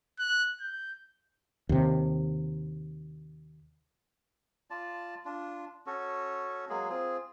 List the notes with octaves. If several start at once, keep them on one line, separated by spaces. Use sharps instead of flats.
F#6
G6
D#2 C3
F4 D5 A5
D4 F4
C#4 F#4 A4
F#3 G#3 A#3 G#4
C4 F4 G#4